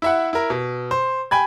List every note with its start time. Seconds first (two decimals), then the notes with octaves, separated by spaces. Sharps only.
0.02 E4 E5 F#5
0.33 E4 A#4
0.50 B2
0.91 C5
1.31 G5 G#5 B5 G#6